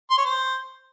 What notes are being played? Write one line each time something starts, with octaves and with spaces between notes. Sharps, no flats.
C6
C#5
C5